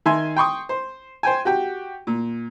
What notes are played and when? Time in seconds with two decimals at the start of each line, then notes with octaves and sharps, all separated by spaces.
0.06 D#3 E5 G#5 C6
0.37 G5 C6 C#6 D#6
0.69 C5
1.23 C5 G5 G#5
1.45 F#4 G4 G5
2.07 A#2